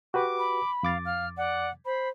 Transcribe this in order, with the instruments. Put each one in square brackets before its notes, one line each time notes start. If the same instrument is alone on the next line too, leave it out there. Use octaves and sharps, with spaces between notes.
[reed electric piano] F#4 G4 B4 [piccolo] D6
[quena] B5
[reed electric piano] F2 D6 A6 [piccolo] F5
[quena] F5 [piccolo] F6
[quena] D5 [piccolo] F#5
[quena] C5 [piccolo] B5